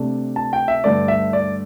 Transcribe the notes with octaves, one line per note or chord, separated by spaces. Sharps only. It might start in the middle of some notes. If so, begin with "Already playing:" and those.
Already playing: C3 A3 D4
A5
G5
E5
G2 D3 A3 D5
E5
D5